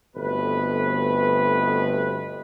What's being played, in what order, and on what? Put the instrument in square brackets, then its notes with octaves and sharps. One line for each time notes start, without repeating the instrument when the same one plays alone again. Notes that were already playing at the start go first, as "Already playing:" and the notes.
[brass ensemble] G1 B2 A3 C4 B4